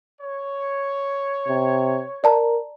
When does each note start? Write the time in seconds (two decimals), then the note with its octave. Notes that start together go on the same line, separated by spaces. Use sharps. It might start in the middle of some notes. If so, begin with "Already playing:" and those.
0.22 C#5
1.48 C3
2.24 A#4 D5 A5 A#5